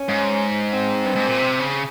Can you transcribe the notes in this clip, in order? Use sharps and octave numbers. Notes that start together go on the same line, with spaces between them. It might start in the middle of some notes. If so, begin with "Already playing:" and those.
Already playing: C#4
G#2
C4
G2
G#2
A#2
C3
C#3